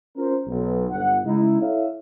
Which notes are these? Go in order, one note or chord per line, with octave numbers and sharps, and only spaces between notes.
C#4 F4 A#4 C5
B1
G1 F#5
C#3 G#3 D#4 E4
E4 A4 C#5 E5 F5